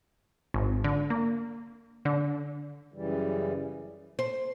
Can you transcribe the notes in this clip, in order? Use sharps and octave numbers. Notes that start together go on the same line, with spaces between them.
G#1
D3
A#3
D3
F#2 C#3 E3 G3
C5